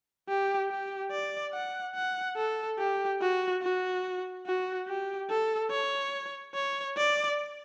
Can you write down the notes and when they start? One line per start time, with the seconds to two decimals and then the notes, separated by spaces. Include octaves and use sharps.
0.28 G4
0.70 G4
1.11 D5
1.53 F#5
1.95 F#5
2.36 A4
2.79 G4
3.21 F#4
3.62 F#4
4.46 F#4
4.88 G4
5.30 A4
5.71 C#5
6.55 C#5
6.97 D5